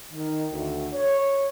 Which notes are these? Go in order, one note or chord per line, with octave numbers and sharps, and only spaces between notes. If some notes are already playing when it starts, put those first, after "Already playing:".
D#3
D2
C#5